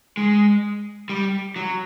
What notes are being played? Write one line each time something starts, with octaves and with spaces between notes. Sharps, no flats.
G#3
G3
F#3